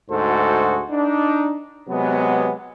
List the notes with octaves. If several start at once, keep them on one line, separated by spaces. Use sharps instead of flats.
D2 G#2 F#4 G#4 A4 C5
D4 D#4
C3 F#3 G#3 B3